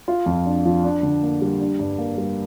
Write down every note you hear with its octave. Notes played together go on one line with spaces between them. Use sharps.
F4
F2
D4
F3
D4
D3
A#3
G3
D4
G2
A#3
G3